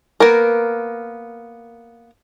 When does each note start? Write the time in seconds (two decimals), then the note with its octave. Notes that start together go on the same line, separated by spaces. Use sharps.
0.20 A#3 B3 A#4